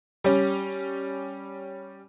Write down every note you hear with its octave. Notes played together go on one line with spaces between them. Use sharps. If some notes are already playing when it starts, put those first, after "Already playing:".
G3 C#4